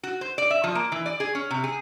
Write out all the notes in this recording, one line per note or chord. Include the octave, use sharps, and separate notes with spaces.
F#4
C5
D5
E5
F3
A#3
E3
D5
G#4
C#4
C3
G#4